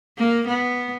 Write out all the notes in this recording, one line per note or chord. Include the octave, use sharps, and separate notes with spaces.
A#3
B3